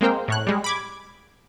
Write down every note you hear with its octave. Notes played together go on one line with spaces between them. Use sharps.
G#3 A#3 C4 A#4 C5 G5
A2 C#5 F#6
G3 G#3
B5 D6 G#6